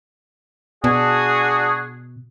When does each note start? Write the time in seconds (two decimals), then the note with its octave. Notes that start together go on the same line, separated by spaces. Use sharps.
0.84 B2 D4 F#4 G#4